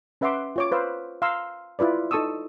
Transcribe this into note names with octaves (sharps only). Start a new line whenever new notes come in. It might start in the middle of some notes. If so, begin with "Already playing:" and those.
C#4 B4 E5 F#5 C6 D6
F4 C#5 D6
B4 C5 F5 E6
F5 A#5 C6 E6
E4 F4 B4 D5
D#4 A4 A5 C#6 D#6 E6